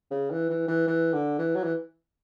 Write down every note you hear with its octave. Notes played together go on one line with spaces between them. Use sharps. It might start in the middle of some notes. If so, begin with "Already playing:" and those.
C#3
E3
E3
E3
E3
D3
E3
F#3
E3